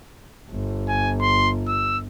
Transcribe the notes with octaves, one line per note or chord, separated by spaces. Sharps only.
G1
G#5
C6
E6